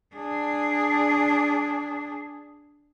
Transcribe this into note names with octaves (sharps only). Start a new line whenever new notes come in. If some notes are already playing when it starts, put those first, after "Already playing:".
D4 G#4